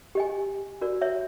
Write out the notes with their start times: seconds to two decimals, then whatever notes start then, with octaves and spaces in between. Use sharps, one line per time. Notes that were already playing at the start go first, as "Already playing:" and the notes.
0.15 G4 D#5 G#5
0.81 F#4 A#4 D5
1.01 C#5 E5